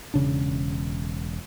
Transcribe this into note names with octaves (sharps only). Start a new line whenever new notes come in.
E1 C#3 D4